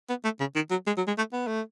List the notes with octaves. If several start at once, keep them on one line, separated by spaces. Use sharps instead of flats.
B3
A3
C#3
D#3
F#3
G#3
F#3
G#3
A3
B3
A3